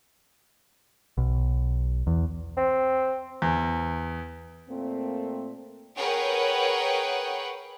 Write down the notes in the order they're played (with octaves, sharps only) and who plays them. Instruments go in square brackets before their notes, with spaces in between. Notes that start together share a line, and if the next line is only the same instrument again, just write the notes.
[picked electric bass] B1
E2
[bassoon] C4
[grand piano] E2
[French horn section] A#2 A3 A#3 C4
[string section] G#4 A#4 B4 C#5 F#5 G5